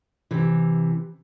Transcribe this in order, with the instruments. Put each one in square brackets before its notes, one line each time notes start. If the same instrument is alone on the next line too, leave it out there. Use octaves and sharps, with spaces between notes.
[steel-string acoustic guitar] C3 E3